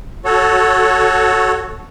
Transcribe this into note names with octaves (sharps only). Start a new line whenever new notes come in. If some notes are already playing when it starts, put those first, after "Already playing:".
F#4 A4 C#5